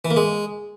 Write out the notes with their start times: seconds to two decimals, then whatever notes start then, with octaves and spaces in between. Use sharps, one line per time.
0.05 E3
0.11 A#3
0.16 G#3